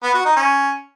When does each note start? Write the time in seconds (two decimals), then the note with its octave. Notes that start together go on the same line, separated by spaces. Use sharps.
0.03 B3
0.14 F#4
0.25 D#4
0.36 C#4